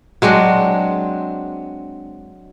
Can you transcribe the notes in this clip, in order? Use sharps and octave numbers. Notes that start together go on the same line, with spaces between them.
F#3 G#3 C4 D4